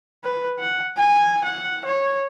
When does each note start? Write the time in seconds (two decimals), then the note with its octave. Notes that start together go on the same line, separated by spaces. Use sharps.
0.24 B4
0.59 F#5
0.97 G#5
1.44 F#5
1.85 C#5